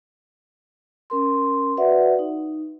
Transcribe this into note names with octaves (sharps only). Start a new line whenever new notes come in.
C#4 A#4 C6
F#4 B4 D5 E5 F#5
D#4